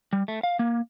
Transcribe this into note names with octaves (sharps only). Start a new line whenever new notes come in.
G3
A3
F5
A#3